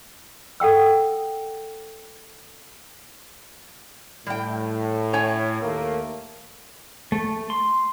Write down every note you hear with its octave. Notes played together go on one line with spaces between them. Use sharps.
A4 F#5 G5 E6
A2 G3 G5
C#5 G5 G#5
D#2 A3 A#3
A3
C6